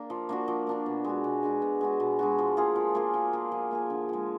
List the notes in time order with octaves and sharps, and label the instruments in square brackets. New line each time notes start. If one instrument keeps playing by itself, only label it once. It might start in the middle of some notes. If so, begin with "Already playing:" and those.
Already playing: [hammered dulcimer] A#3 D4
F3
A#3 D4 F#4
F3
A#3 D4 F#4
B2
G#3 D4 F#4
B2
G#3 D4 F#4
B2
G#3 D4 F#4
B2
G#3 D4 F#4
F3
A#3 F4 G#4
F3
A#3 F4 G#4
F3
A#3 F4 G#4
F3
A#3 F4 G#4
D3
F3 G#3